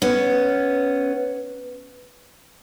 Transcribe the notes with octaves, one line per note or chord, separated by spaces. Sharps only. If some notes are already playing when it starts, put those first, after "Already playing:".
B3 C#4